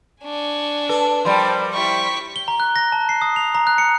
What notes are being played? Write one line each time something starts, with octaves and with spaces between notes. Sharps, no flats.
D4 G#5 C#6
A4 B4
F3 G3 A#4 C5 G5 B5 C6
E4 G4 C#6 B6
G7
A#5
F#6
A#6
A5
C7
D#6
F7
A#5
F#6
C#7